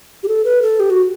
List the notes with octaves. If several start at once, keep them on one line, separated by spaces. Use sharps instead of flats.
G4
A4
B4
A4
G4
F#4